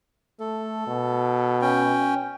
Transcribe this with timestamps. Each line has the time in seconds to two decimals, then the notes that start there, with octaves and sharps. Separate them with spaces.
0.40 A3 A4
0.87 B2
1.61 C#4 G5